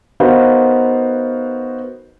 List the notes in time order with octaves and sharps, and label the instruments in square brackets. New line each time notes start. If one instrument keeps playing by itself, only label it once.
[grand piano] B3 D#4 F#4 A#4 C5 F5